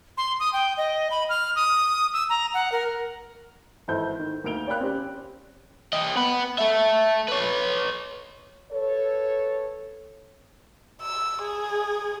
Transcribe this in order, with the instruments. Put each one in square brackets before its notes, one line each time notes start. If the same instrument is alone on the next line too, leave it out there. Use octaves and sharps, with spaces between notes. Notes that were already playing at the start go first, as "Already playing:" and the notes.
[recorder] C6
D#6
G5
D#5
B5
F6
D#6
E6
A#5
F#5
A#4
[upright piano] G#1 E3 E4 A4 C5 G6
D#3
D2 A#3 D#4 D7 F7 G7
C#5 D5 F5 G5 B5 F#6
C4 C#4 G4 D5
[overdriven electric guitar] G4 D#5
B3 B4
A4 E5
B4 C#5
[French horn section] A4 B4 C#5
[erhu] E6
G#4